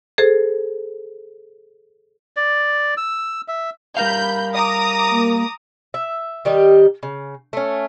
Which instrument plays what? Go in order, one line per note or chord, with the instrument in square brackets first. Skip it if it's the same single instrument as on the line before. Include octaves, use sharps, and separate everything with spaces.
[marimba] G#4 A4 C5
[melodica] D5
E6
E5
[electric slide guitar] G3 A#4 F5 [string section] B5 G6
[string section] A#5 D6 D#6
[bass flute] A#3
[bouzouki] E5
D#3 G3 G4 D#5
C#3
A3 C#4